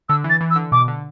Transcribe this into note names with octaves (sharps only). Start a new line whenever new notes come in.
D3 E6
E3
A6
E3
E6
D3
B2 D6
D3